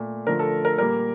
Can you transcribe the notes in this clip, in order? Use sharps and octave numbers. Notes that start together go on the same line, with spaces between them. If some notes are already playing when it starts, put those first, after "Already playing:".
Already playing: A#2 A3
D3 F3 A3 A#4
A4
A#4
A#2 G3 A#3 A#4